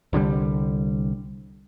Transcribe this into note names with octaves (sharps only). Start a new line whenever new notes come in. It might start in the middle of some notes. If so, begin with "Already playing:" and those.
C2 D3 E3 G3